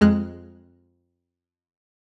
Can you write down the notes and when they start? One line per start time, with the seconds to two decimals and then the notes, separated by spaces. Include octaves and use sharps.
0.01 F2 G#3 F6 F#6